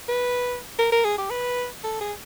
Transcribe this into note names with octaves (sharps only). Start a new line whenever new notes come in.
B4
A#4
A#4
G#4
G4
B4
A4
G#4